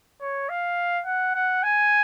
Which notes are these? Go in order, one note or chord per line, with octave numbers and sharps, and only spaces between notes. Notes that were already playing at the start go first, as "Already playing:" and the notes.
C#5
F5
F#5
F#5
G#5